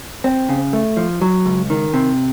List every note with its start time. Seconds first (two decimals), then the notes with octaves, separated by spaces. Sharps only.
0.24 C4
0.49 C#3
0.73 A3
0.97 F3
1.22 F#3
1.46 C#2
1.70 D#3
1.94 C3